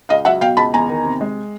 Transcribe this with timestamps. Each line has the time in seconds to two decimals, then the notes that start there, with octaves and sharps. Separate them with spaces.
0.09 C#2 D#5 F5
0.25 F#3 E5 F#5
0.41 B2 F5 G5
0.57 C#2 A5 B5
0.74 E2 G#5 A#5
0.89 D#3
1.05 C3
1.21 G#3